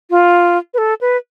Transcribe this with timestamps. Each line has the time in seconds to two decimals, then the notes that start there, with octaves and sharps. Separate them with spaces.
0.10 F4
0.74 B4
0.78 A4
1.01 B4